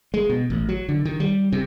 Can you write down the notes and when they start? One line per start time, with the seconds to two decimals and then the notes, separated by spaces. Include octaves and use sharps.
0.14 G#3
0.29 B2
0.50 A1
0.69 F#3
0.89 D3
1.05 D#3
1.20 G3
1.52 C3